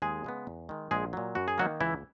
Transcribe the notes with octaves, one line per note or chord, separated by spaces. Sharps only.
D#2 G#3 G#4
C#3 G#3 B3
E2
D#3 G#3
A#1 G#3 G#4
A#2 F#3
F#2 F#4
G#4
D#3 F#3 A#3 F#4
C#2 E3 E4